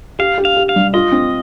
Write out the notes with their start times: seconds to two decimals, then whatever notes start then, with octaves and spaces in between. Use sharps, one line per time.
0.19 G4 F5
0.38 G4
0.45 F5
0.57 G4
0.69 F5
0.76 G3
0.94 F4 D#5
1.12 C4